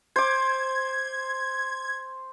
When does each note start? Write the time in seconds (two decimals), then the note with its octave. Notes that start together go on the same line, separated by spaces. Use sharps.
0.16 C5 D6 G#6